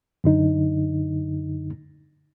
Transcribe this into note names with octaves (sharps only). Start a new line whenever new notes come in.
F#2 D3 D#4